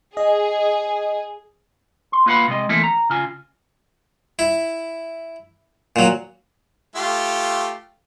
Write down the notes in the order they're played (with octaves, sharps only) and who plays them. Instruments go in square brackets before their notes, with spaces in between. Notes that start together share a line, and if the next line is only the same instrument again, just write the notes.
[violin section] G#4 [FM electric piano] D#5
[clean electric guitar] C6
A#3 F4 B4 F5 F#5 B5
C3 G#3 D#5
E3 A3 A#3 C4 E4 A4
A#5
C#3 F4 G#5
[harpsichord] E4
A#2 F#3
[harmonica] A3 F4 G4